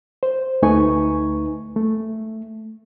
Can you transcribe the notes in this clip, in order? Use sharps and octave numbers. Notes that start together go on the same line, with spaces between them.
C5
D2 A3 D#4 B4 G#5 C#6
A3